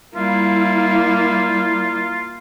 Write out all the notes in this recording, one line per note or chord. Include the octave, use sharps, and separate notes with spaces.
G3 A#3 E4 F4